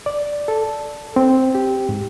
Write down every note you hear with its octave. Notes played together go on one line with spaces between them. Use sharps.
D5
A4
C4
G4
G#2